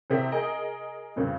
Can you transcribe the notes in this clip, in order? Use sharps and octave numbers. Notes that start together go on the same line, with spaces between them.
A1 C3 C4 E5
G#4 A#4 D#5
F1 G2 C#3 C4